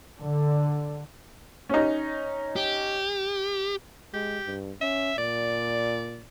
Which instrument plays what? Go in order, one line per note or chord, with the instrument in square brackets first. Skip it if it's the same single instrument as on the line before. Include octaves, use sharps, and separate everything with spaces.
[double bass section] D3
[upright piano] C#4 D#4
[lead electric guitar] G4
[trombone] G#3 [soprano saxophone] G4
[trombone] G2
[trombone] C#4 [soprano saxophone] E5
[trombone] A#2 [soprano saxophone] D5